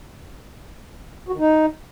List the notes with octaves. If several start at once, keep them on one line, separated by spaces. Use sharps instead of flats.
F#4
D#3
D#4